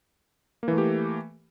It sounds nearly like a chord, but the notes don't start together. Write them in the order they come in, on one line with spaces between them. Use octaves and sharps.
A#3 E3 A3 G4